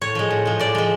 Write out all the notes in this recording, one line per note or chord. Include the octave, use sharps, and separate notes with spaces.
A2 C#5
F3 G#3
A2
F3 G#3
A2 D5
F3 G#3